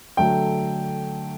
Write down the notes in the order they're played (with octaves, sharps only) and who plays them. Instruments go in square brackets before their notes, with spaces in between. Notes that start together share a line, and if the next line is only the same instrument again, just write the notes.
[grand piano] D3 F#3 A3 G5